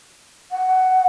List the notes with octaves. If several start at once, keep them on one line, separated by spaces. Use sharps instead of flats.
F#5